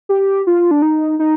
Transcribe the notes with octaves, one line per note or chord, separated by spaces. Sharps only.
G4
F4
D4
D#4
D#4